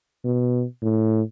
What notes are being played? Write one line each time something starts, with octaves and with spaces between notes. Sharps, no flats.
B2
A2